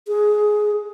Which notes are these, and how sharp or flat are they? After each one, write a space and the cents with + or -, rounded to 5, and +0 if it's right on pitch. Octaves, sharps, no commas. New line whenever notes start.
G#4 +10